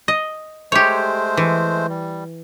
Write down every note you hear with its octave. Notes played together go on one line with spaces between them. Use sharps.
D#5
G#3 A3 G4 C5 C#5
E3
G3